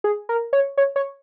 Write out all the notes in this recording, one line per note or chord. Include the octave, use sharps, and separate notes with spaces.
G#4
A#4
C#5
C#5
C#5